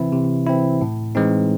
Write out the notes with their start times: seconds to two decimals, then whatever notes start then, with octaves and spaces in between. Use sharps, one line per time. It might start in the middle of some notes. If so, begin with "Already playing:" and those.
Already playing: C3 E3 C4 E4
0.12 C3
0.47 E3 C4 E4
0.81 A2
1.15 E3 G#3 C4 D#4